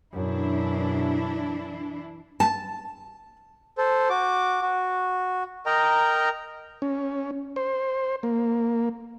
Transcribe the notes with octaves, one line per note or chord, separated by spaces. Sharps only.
F#2 B2 E3 D4 E4
A5
A4 C5
F#4 D6
F#4
A#4 D#5 G5 A#5
C#4
C5
A#3